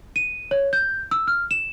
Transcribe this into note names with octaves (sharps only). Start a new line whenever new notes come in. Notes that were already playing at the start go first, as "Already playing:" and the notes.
D#7
C#5
G6
E6
F6
E7